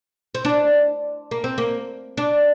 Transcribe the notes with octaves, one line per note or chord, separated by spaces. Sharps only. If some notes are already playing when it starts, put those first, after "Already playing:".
C4
D4
A#3
C4
A#3
D4